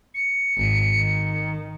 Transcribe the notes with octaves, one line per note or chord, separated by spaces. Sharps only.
C#7
G#1
D#3